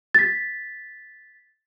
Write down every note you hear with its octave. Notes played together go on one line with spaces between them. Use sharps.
A6 B6